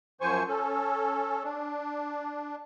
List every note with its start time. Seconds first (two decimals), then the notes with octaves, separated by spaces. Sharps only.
0.21 F#2 F3 C5 G#5 C#6
0.48 C#4 A4
1.43 D4